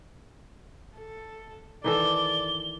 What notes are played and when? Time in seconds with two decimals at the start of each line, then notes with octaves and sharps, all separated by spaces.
0.97 A4
1.84 D#3 E3 A4 D5 G7